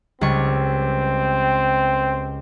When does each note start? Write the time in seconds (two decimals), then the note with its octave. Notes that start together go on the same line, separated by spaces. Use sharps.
0.21 C#2 G3 C4 C#6